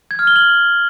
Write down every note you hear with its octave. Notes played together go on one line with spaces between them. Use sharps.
G#6
F6
G7
F#7